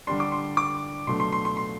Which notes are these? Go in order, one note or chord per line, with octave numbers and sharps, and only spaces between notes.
D3 G3 D4 C6
D6
C6
D6
B2 F#3 A3 D4 C6
C6
C6
C6
C6